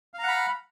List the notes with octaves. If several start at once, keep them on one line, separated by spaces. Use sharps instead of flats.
F5 F#5 A#5 B5